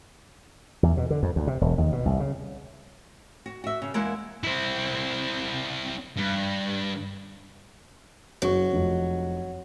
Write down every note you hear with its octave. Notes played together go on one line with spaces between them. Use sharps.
E2
B2
D3
F2
D2
C3
E1
D#2
B2
C2
C#3
F#4
F#4 E5
C#3
E2 G#3 A#3 E4 F#5
C4 E4
G2
F#1 F#3 C#6
F1 F3